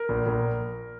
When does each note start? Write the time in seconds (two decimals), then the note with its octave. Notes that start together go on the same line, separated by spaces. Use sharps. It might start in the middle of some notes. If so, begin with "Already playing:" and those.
Already playing: A#4
0.09 A#1
0.26 A#1